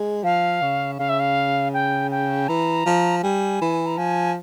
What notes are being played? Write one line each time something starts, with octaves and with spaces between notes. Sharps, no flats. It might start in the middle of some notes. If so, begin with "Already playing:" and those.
Already playing: G#3
F3 F5
C#3
C#3 F5
E5
F5
G5
G5
E3 A#5
F3
G3 G#5
E3
A#5
F3 G#5